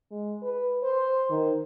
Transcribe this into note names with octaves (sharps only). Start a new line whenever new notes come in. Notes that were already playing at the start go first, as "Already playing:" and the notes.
G#3
B4
C5
D#3